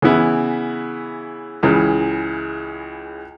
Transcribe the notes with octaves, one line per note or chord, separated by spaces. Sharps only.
C#3 E3 B3 E4
C#2 C#3 E3